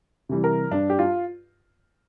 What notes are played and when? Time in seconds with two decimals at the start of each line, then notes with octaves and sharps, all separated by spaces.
0.29 C3 E3 G3
0.44 A#4
0.71 G2 D4
0.90 G4
0.99 F4